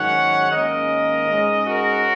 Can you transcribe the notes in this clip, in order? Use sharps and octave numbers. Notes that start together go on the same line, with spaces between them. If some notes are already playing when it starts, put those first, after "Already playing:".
Already playing: G#2 D#3 F#3 C#4 C#5 F#5
G#2 D#3 A#3 C#4 A#4 D#5
G#2 G#3 C#4
F#4 A#4